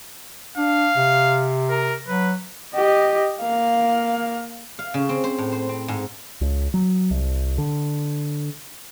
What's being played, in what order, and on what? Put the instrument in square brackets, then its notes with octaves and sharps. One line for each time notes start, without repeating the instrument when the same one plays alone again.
[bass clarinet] D4 [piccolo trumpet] F5
[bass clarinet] C3
[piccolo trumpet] A#4
[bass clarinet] F#3 [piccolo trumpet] B4
[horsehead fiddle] G4 D#5
A#3 F5
[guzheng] F5
C#3
C4
C5
A2
C5
C4
G#2
[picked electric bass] C#2
F#3
C2
D3